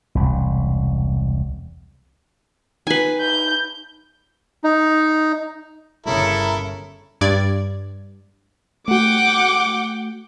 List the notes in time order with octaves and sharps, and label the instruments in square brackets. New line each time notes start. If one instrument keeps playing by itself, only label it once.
[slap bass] E1 C2
[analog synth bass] D#4 [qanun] B4 G#5
[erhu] G6
[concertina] D#4
[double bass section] G1 C#3 [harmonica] E4 A4 A#4
[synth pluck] G2 D5 G#6
[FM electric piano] A3 F#4 [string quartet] F#5 G5 [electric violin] D6